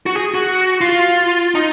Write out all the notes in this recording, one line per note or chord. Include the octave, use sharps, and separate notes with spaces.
F#4
G#4
F#4
F4
D#4